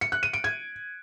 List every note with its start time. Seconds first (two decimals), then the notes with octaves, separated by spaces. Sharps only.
0.01 C#7
0.12 F#6
0.23 D#7
0.33 D7
0.44 G#6